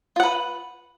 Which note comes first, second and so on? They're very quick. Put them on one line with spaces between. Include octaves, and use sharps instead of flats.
F4 F#5 B4